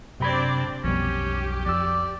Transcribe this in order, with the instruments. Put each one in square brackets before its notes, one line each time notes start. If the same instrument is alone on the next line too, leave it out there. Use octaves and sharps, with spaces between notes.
[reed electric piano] F#2 B5 G#6 [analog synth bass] C3 [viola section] C4 D4 D5
[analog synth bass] B1 [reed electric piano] F2 B2 G3 [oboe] C#4 [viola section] G4
[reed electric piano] F2 E6 [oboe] D5